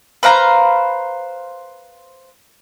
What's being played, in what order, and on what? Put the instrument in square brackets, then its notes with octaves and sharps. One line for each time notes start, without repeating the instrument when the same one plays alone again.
[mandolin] B4 C5 F5 A#5